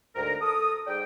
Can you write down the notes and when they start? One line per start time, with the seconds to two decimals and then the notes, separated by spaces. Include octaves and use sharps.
0.16 D2 G#2 A#4
0.41 A4 D#6
0.87 G#2 D5 G5